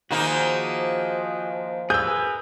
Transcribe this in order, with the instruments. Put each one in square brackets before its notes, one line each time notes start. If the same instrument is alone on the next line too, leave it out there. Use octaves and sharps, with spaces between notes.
[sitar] D#3 A#3 D#4 [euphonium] F3 [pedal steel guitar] F#4 G#4 C5
[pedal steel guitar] G#4 A#4 B4 [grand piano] E6 G6